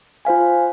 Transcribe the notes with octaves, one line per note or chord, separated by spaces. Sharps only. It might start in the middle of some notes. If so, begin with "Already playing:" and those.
F4 C5 F5 G#5